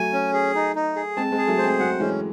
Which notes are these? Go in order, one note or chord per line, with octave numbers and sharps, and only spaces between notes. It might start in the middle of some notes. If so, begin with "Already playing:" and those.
Already playing: F#3 A3 G#5
C#4
G#4
D#4
D#4
G#4
G#3 C4 A5
G#3 C4
G#4
F#3 A3
C5
G#3 C4
F#3 A3 F#5
E3 G#3 C#4